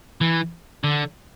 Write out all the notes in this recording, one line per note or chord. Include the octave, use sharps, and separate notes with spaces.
E3
D3